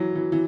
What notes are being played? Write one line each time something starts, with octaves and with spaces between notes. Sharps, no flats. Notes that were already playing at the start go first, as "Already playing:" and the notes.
Already playing: E3 F#3
E3
E3